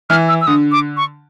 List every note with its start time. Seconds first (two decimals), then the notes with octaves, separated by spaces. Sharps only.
0.10 E3 F6
0.28 E6
0.41 E6
0.47 D3 D#6
0.72 D6
0.97 C#6